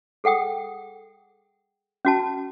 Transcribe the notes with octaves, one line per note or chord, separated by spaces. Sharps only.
G#4 A4 F#5 G5 D#6
C#4 F#4 A5